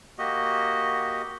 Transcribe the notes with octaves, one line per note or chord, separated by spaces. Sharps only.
A#3 F#4 G4 D#5